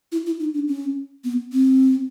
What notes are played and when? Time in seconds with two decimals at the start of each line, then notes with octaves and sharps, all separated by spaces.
0.12 E4
0.26 E4
0.40 D#4
0.54 D4
0.68 C#4
1.24 B3
1.52 C4